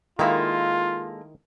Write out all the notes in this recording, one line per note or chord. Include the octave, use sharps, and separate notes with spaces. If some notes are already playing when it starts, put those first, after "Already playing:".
D#3 G#3 A#3 E4 F4 A4